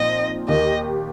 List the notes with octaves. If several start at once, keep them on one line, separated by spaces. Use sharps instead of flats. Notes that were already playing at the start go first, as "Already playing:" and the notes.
Already playing: A#2 F3 C4 D#4 C5 D#5
D#2 D#3 A#3 G4 D#5